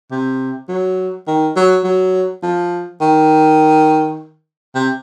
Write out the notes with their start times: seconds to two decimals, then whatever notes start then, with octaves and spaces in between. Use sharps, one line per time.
0.11 C3
0.69 F#3
1.27 D#3
1.56 F#3
1.84 F#3
2.43 F3
3.01 D#3
4.75 C3